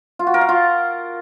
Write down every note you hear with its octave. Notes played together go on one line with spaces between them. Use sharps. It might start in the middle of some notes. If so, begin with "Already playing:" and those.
F4
F#4
A#4
F5
F4